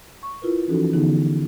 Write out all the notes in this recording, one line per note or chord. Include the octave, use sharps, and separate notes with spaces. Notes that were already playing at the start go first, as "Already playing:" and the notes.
C#6
E4 F4 A#4 B4
E3 F3 C#4 D#4 F#4 A4
D3 E3 B3 D#4 G#4